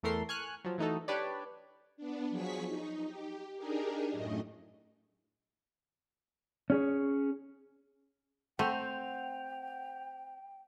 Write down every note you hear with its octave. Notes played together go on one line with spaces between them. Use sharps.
E2 E3 A3 A4 A#4 C6
G#5 C#6 F6 F#6
F3 F#3
E3 A3 D#4 F#4 A4
D4 G4 B4 C#5 D5
B3 D4
F3 F#3 G#4 C#6 B6
D#4
G4
D4 D#4 G4 G#4 A#4
F#2 A2 A3 D#5
C#4 G#4 C#5
A3 C4 F#5 G5 G6 F7